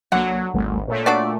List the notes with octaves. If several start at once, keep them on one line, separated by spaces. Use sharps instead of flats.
C2 D3 F#3 A#3 D4 F#5
G#1 D2 G3 A3
A#2 A3 C#5
D4 F#4 D5